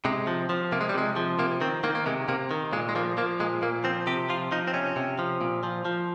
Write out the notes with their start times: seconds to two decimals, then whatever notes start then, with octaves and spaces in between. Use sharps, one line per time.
0.05 C3 G#3
0.27 F3
0.49 F3
0.72 C3 A#3
0.81 G#3
0.89 G3
0.95 C3 G#3
1.16 F3
1.39 C3 A#3
1.61 D#3 C4
1.84 D#3 A#3
1.95 A#3
2.06 C3 G#3
2.28 C3 A#3
2.51 D#3
2.73 A#2 G#3
2.89 G#3
2.95 F3 A#3
3.17 F3 A#3
3.40 A#2 G#3
3.62 A#2 A#3
3.84 F3 C4
4.07 C3 G4
4.29 F3 F4
4.51 F3 D#4
4.68 C4
4.74 C3 C#4
4.96 C3
5.19 F3
5.41 A#2
5.63 F3
5.85 F3